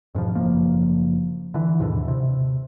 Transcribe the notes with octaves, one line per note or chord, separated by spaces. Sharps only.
F2 G#2 B2 F3
F#1 F3 A#3
D3 E3
D#2 G#2 B2 D3
C3